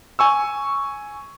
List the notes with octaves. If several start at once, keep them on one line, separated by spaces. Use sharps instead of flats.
G#5 C#6 E6